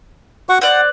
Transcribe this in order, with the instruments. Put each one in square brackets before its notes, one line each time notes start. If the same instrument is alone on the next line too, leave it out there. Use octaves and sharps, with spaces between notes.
[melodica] F#4 F#5 C#6
[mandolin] C5 D5 F#6 [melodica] F#5